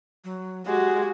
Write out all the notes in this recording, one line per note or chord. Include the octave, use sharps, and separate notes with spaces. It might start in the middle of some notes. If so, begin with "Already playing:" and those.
F#3
G#3 F#4 G4